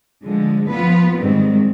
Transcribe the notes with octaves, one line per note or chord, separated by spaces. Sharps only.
D3 F3 G#3
F3 B3 F4 B4
G#2 D#3 G3 C4